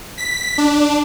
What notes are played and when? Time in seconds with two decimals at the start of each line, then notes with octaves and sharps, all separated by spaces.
0.18 B6
0.58 D4